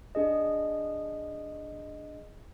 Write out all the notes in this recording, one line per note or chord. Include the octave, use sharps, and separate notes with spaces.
D4 G#4 D#5